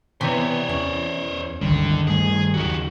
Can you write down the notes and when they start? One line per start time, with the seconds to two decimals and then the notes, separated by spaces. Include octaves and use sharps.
0.21 C3 E3 B3 C5 C#5 G#5
0.69 E2 C#4
1.61 G1 C#2 D3 D#3 G3
2.07 G2 A3 G#4 G#5
2.54 D#2 C#3 F#3 F#4 G4